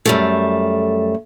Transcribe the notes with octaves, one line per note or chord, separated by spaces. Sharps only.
F#2 G3 A3